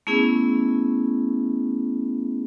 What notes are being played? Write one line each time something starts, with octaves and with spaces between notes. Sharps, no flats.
A3 B3 C#4 E4 G#4